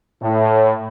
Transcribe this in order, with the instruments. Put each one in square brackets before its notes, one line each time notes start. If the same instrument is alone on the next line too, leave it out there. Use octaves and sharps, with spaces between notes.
[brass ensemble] A2